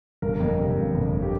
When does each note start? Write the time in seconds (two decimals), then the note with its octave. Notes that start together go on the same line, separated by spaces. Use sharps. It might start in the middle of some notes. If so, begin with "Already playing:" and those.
0.22 G1 A#4
0.40 F2
0.59 C3
0.76 G1
0.94 G1
1.13 F2
1.22 G4